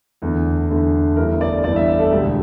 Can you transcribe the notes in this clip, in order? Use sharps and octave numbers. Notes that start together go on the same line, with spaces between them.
E2 D3 A3
E2 D3 A3
G1 G2 E3 A3 A#4
D5
G1 G2 E3 A3 D5
E5
E5
A4
E1 D2 D3 G4